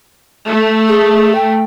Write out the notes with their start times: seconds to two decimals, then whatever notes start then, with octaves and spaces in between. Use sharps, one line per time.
0.47 A3
0.88 G#4
1.35 G5